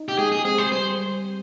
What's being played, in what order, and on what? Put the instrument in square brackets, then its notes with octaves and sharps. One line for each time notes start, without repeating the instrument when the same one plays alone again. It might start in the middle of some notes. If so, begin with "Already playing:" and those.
Already playing: [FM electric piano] D#4
[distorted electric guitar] G4
[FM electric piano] G#3 [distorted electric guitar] G#4
[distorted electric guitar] G#4
[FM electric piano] C4 [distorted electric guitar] G#4
[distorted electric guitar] C5
[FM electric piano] G3 [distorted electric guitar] C5